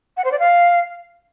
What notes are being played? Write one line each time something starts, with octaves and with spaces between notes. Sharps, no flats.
F#5
C5
D5
F5